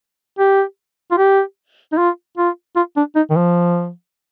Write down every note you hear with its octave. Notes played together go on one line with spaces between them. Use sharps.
G4
F4
G4
D#4
F4
F4
F4
D4
D#4
D#3
F3